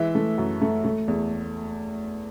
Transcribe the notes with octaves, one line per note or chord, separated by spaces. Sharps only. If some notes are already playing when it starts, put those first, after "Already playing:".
Already playing: E3 G#3 E5
A3
F#2
A3
A3
E2